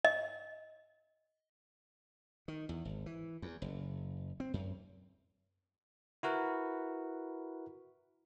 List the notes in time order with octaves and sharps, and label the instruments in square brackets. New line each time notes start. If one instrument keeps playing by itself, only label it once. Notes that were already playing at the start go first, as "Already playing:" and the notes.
[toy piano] D#5
[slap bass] D#3
E2
G#1
E3
E2
F#1
C4
F#2
[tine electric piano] E4 F#4 A#4 B4